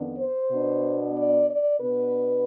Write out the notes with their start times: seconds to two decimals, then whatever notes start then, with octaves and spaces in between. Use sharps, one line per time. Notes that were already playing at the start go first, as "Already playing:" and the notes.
Already playing: F2 D#3 B3 D4
0.19 C5
0.51 B2 B3 D4
1.16 D5
1.48 D5
1.80 B2 B3 D4 B4